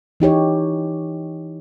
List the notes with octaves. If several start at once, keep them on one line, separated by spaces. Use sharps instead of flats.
E3 D#4 G4 C#5